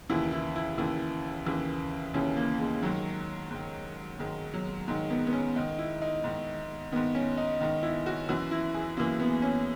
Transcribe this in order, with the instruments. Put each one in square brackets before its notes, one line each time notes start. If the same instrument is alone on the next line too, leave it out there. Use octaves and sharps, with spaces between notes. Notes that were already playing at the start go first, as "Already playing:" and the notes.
[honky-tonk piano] D#2 C#3 E3 E4
E4
E4
D#2 C#3 E3
D#2 C#3 E3
D#2 C#3 E3 C#4
A#3
G#3
G#2 D#3 F#3
G#2 D#3
G#2 D#3 G#3
F#3
G#2 D#3 G#3
B3
B3
C#4
G#2 D#3 D#4
E4
D#4
G#2 D#3
G#2 D#3 B3
C#4
D#4
G#2 D#3
E4
F#4
F#2 E3 F#4
E4
G#4
F#2 E3 A#3
B3
C#4